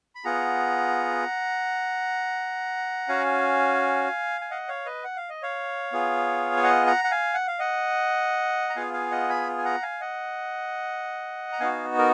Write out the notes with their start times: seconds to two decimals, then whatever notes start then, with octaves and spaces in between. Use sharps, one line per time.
0.15 B5
0.24 B3 F4 G#4 F#5 A#5
3.08 C#4 F#4 F5 G#5
4.41 G#5
4.51 D#5 F#5
4.68 C#5 F5
4.85 B4 D#5
5.04 F#5
5.17 F5
5.30 D#5
5.43 C#5 F5
5.92 B3 F4 G#4
6.57 G#5
6.63 D#5 F#5
6.87 F#5 A#5
7.04 F#5
7.11 F5 G#5
7.34 F#5
7.47 F5
7.59 D#5 F#5
8.70 A#5
8.76 B3 F4 G#4 F5 G#5
8.93 F5 G#5
9.11 D#5 F#5
9.29 G#5 B5
9.58 G#5
9.64 F#5 A#5
9.82 F5 G#5
10.01 D#5 F#5
11.53 A#5
11.60 B3 D#4 F#4 F5 G#5
11.98 A#4